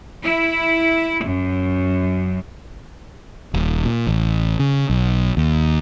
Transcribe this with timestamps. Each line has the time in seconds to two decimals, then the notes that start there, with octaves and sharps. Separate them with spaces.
0.24 E4
1.24 F#2
3.54 D#1
3.85 A#2
4.07 A1
4.59 C#3
4.90 B1
5.37 D#2